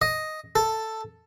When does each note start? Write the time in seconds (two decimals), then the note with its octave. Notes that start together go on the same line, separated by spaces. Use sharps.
0.02 D#5
0.56 A4